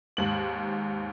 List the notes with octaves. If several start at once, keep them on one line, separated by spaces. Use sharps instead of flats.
D#2 G#2 F#7